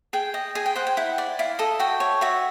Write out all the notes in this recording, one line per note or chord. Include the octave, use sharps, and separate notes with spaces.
G#4 G5
D#5
G#4 G#5
G5
C5 F#5
G5
E4 F#5
D5
E4 F5
A4 D#5
F#4 G5
C#5
F#4 E5